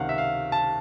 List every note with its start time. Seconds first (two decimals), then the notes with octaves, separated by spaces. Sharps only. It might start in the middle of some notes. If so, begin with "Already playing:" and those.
Already playing: C#2 C3 D#3 F5 F#5
0.09 E5
0.18 F5
0.52 A5